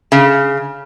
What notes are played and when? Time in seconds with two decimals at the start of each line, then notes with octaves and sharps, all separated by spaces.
0.12 C#3